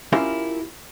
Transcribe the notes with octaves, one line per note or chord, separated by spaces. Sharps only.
C#4 E4 F4 G4 A#4